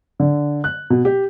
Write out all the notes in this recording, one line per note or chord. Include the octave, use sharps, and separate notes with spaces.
D3
F#6
B2
G4